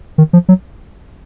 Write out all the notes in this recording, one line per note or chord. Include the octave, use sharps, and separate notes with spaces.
D#3
F3
F#3